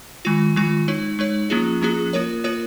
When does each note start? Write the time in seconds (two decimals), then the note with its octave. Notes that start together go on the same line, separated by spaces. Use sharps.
0.25 D#3 G#3 F4
0.56 D#3 G#3 F4
0.88 G#3 D#4 C#5
1.19 G#3 D#4 C#5
1.50 F3 A#3 C#4 F4 G#4
1.81 F3 A#3 C#4 F4 G#4
2.13 A#3 F4 A#4 C#5
2.44 A#3 F4 A#4 C#5